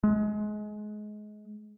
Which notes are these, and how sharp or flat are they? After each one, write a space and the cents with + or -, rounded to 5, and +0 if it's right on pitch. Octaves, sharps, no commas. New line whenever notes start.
G#3 +25